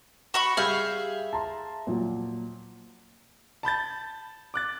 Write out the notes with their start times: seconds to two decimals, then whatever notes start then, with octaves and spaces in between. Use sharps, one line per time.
0.34 F#4 B5 C#6
0.57 G3 G#4 E5 F5 B5 G6
1.33 A5 A#5 C6
1.87 A#2 F3 F#3
3.63 A5 B5 G6 A6
4.54 D6 F#6 A6